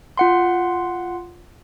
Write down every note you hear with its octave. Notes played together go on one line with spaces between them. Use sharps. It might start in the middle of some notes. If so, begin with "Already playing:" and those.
F4 F#5 C6